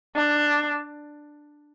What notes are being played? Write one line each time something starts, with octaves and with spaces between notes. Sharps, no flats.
D4